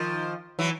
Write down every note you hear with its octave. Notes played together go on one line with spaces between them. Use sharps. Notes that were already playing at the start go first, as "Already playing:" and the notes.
Already playing: D#3 F3
E3 F#3